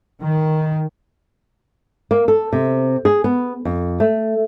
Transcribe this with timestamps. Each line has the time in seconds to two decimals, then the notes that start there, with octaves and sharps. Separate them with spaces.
0.21 D#3
2.11 A#3
2.28 A4
2.53 C3
3.05 G#4
3.24 B3
3.65 F2
4.00 A3